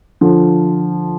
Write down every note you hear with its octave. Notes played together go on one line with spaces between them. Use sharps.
D3 F3